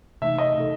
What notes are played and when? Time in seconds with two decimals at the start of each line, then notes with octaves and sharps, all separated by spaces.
0.22 C3 E3 A3 D#4 E5
0.38 D#5
0.55 B2 A3 D#4 A4